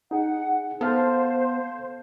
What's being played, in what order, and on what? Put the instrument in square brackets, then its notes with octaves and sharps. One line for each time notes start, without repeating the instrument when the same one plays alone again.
[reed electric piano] D#4 G#4 [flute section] F#5
[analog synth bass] B3 [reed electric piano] A4 F5 A5 [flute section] C5